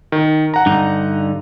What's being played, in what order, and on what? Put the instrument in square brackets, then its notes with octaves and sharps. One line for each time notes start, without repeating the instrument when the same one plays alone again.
[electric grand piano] D#3
F#5 A#5
[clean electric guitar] G2 D3 D#4